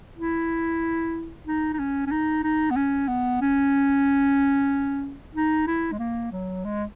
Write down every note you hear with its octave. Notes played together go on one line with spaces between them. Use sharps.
E4
D#4
D#4
C#4
C#4
D#4
D#4
B3
C#4
B3
C#4
D#4
E4
G#3
A#3
F#3
G#3